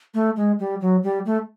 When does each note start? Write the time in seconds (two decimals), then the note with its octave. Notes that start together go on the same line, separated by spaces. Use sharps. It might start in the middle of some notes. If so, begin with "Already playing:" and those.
0.14 A3
0.36 G#3
0.59 G3
0.81 F#3
1.03 G3
1.26 A3